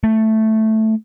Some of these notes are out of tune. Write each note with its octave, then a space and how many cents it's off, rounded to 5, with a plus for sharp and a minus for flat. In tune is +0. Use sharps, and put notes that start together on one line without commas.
A3 +0